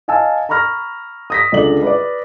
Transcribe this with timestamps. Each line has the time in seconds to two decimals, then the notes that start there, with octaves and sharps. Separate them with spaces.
0.08 D#5 F5 G#5 A5 E6
0.49 A#5 B5 C#6 F6 A#6
1.30 D#6 A#6 B6
1.52 C#2 D3 D5 F#7
1.82 B4 D5